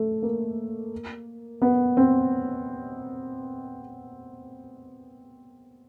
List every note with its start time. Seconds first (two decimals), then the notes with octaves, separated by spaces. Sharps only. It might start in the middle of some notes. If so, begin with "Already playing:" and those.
Already playing: A3
0.22 A#3
1.62 B3
1.97 C4